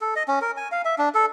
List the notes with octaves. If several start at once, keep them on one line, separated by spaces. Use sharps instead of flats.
A4
D#5
C#4
A#4
G#5
F5
E5
D4
A4